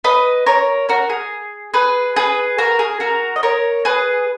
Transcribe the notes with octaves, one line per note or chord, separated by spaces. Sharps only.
B4 D#5
A#4 C#5
F#4 A#4
G#4
G#4 B4
G#4 B4
F#4 A#4
G#4
F#4 A#4
D#5
A#4 C#5
G#4 B4